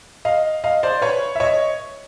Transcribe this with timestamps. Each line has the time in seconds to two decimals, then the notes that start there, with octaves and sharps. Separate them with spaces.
0.25 D#5 F5
0.64 D#5 F5
0.83 C5 D5
1.02 B4 C#5
1.35 E5
1.40 C#5 D#5